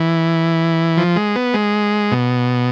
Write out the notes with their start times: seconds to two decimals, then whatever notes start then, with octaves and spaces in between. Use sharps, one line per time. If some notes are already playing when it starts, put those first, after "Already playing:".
Already playing: E3
0.97 F3
1.16 G#3
1.36 B3
1.54 G#3
2.12 B2